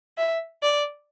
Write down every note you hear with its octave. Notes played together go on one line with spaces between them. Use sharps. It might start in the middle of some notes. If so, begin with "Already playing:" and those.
E5
D5